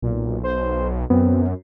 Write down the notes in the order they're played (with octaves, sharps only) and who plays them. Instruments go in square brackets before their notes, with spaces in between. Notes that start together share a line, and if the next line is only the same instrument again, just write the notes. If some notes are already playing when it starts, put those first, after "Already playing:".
[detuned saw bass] B1 [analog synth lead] A#2
[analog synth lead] C5
[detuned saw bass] F#2 [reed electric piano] B3 [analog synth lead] C4